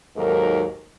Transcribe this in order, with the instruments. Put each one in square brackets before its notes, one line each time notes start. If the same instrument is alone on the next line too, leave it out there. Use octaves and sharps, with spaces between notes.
[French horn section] D#2 G#2 F#3 A4 A#4